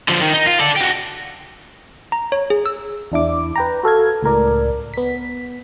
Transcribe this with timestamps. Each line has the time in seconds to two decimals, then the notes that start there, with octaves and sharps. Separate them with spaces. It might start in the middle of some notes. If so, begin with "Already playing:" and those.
0.09 D3 F3
0.22 D#3
0.34 D#4
0.47 F4
0.61 A4 D5
0.77 F#4 G4
2.12 A#5
2.32 C#5
2.50 G#4
2.66 E6
3.12 E2 D4 E4 D6
3.56 B4 G5 A#5
3.83 F#4 A4 F5 G#6
4.23 C#2 A2 A#4 D5
4.94 B3 B6